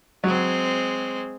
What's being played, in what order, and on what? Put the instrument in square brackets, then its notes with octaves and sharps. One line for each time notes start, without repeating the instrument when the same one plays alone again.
[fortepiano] F#3 [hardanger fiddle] G#3 C4